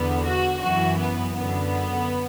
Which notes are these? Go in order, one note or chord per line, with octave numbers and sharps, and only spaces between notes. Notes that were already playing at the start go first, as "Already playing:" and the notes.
Already playing: E2 D3 B3
F#4
F#2 E3 F#4
B3
F#2 D3 B3